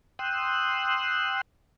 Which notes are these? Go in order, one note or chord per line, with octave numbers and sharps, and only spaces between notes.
G5 C6 D#6 E6 F#6